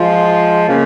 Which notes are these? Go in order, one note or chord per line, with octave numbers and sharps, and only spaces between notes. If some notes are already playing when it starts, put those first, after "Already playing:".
Already playing: F3 G#3 F4
C#3 A#3 F4